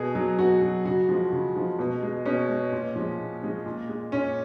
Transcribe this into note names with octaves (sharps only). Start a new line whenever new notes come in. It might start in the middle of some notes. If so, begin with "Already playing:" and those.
Already playing: B2 G#4
F#3
B2 F#4
F#3
C#3 F#4
F3 G#3
C#3
F3 G#3
B2
G#3
B2 C#4
G#3
A#2
F3 G#3
A#2
F3 G#3
A#2
G#3
A#2 C#4